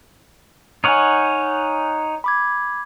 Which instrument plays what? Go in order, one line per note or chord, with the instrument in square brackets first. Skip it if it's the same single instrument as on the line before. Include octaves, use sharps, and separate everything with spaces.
[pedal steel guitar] D#4 C#5 F#5 [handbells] G#5 F6
[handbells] B5 D6 G#6